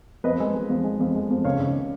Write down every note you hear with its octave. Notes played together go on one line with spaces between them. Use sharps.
F2 B4 D#5
G#3
G#3
F2
G#3
F2
G#3
F2
C#2 C#5 F5
C#2